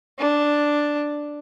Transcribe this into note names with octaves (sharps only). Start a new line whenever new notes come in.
D4